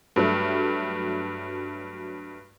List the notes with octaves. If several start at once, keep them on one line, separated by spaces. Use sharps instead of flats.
G2 F#3 A3